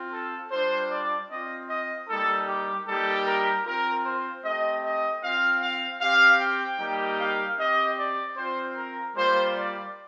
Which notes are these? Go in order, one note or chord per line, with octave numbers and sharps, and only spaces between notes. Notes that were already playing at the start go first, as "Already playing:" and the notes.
Already playing: C4 F4
A4
G3 D4 F4 C5
D5
C4 F4 D#5
D#5
G3 A#3 D#4 A4
G4
G3 A#3 D#4 G4 A4
A#4
C4 F4 A#4
C5
A3 C4 G4 D#5
D#5
C4 F4 F5
F5
C4 G4 F5
G5
G3 A#3 D#4 G4
F5
C4 G4 D#5
D5
C4 F4 C5
A#4
G3 A#3 F4 C5
D5